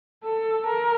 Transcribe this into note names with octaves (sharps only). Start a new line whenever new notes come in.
A4
A#4